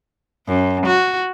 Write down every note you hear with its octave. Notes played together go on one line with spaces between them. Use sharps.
F#2
F#4